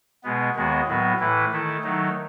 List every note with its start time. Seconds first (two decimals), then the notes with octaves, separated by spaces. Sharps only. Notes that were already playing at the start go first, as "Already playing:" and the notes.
0.24 B2 G#3 B3
0.56 D#2 D#3 G#3 B3 F#4
0.87 A2 F#3 B3 F#4 B4
1.20 A2 E3 A3 E4 B4
1.52 D#3 A3 E4 A4
1.83 D#3 F#3 A3 D#4